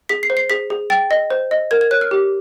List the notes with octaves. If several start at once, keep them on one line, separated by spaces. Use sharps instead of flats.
G#4 B6
C7
C5
C7
G#4 B6
G#4
G5 A6
D#5
C5
D#5
A#4 G#6
G#6
C#5 F#6
F6
G4